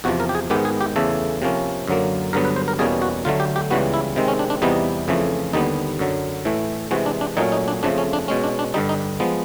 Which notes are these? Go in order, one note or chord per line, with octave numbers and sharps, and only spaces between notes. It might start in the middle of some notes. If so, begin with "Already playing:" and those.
E2 C3 F3 F#4
A#4
G4
G#4
G#2 D#3 G#3 B3 G4
G#4
G4
E2 C#3 E3 A3 A4
C3 F3 A#3 C#4
F#2 D3 F#3 A#3
G2 D3 F#3 B3 A#4
B4
C5
A#4
E2 B2 G3 A#3 C#4 G#4
F#4
D2 D3 F#3 A3 F4
G4
G4
C#2 C#3 E3 G3 B3 F#4
E4
C3 D#3 G#3 C4
C#4
D4
D4
E2 C3 E3 G3 B3 D#4
F2 C#3 E3 A3
D#2 D3 G3 B3 D#4
F#2 D3 F#3
A2 E3 A3
C3 E3 G#3 F#4
D4
D4
A#2 F#3 A3 C#4 D#4
D#4
D4
F2 C#3 F3 A3 D4
C#4
D4
B2 G#3 C#4
D4
D4
G2 D3 G3 D#4
D#4
F3 G#3 B3